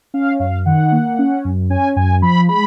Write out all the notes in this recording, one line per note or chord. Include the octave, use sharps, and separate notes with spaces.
C#4 F5
F#2 F5
D#3 F#5
A#3
C#4
F#2
C#4 G#5
F#2 G#5
F3 B5
G#3 B5